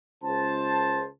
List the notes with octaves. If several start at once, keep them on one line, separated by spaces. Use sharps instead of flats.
C#2 C5 A5